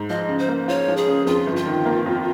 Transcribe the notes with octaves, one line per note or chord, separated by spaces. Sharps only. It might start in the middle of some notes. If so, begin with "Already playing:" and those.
Already playing: G#2
F3 D#5
C#3
C5
A#3
F4 C#5
F3
G#4
C#3
F2 F4
G1
F4
D#3
A#3
F2